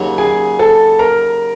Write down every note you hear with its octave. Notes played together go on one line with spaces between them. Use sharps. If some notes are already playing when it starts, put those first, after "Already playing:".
Already playing: D#2 C#3 F#3
G#4 G#5
A4 A5
A#4 A#5